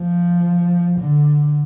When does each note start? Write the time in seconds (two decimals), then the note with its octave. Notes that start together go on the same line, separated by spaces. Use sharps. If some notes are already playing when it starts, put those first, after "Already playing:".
Already playing: F3
0.99 D3